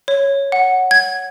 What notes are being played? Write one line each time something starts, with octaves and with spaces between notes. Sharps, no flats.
C#5
F#5
G#6